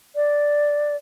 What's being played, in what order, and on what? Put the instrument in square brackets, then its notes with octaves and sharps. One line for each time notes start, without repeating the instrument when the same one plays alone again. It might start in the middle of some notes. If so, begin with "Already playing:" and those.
[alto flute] D5